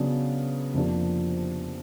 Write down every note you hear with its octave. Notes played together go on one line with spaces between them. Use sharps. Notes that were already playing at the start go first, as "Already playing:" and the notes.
Already playing: C#3 F#3 B3 D4
F2 C3 F3 A#3 D4